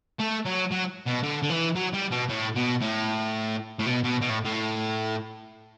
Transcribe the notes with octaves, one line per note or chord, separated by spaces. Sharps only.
A3
F#3
F#3
B2
D3
D3
E3
F#3
G3
B2
A2
B2
A2
A2
B2
B2
B2
A2
A2